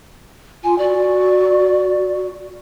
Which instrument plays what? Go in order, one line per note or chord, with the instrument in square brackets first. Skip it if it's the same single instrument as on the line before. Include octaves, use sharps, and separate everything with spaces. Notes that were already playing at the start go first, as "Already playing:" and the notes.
[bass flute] F4 [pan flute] G#5
[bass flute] F#4 [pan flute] D5